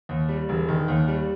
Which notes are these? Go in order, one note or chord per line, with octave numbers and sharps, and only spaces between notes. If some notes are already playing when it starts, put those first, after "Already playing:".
D#2
G3
E1
D#3
D#2
G3